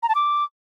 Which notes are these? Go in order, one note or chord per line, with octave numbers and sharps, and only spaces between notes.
A#5
A5
D6